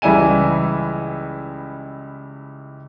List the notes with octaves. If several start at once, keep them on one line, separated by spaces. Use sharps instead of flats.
C#2 E3 G3 E4 G#5 D#7